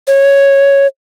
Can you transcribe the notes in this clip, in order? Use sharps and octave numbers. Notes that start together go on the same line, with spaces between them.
C#5